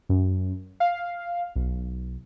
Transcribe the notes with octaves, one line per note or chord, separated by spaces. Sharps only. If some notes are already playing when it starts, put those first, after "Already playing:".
F#2
F5
B1